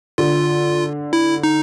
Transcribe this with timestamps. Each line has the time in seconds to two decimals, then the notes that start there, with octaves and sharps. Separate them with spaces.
0.18 D3 F4
1.13 E4
1.44 D#4